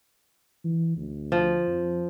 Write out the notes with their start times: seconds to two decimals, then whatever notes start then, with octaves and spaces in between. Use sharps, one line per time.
0.64 E3
0.97 D2
1.32 F3
1.67 F2